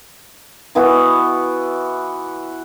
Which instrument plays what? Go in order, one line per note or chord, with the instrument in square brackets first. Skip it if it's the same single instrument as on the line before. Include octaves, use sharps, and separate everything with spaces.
[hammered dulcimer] E3 B3 E4 F#4